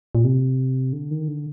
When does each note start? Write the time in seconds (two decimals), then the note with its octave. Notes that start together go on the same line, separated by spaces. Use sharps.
0.15 A#2
0.24 C3
0.93 D3
1.11 D#3
1.28 D3